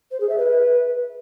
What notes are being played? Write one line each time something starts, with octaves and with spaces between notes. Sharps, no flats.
C5
G#4
E5
B4